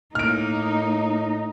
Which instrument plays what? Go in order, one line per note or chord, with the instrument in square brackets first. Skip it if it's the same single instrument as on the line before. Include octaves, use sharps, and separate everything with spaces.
[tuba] A2 [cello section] A#3 [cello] D#4 [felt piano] F6 D7